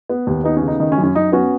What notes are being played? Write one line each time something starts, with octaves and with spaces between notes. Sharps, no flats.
B3
D#2
B3 D#4
C#4
C#3
D#4
D#3 D#4
C#4
F#2
C#4
F#2 D#4
B3 C#4 F#4